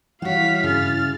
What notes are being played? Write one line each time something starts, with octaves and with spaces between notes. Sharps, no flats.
E3 G3 E4 F#4 C#5 F5 B6
G2 C#3 F6 A6